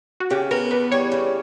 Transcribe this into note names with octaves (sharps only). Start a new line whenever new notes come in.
F#4
C#3 G4
B3 A#4
E2 B4
G3 C#5
C#3